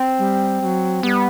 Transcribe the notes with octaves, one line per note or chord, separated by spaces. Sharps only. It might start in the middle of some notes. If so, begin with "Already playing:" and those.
Already playing: C4
G3
G3
F#3
G3 B3